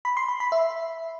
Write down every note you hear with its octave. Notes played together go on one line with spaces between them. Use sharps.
B5
C6
B5
B5
E5